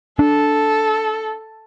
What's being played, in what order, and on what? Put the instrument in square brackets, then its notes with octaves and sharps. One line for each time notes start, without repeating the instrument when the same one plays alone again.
[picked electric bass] D4 [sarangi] A4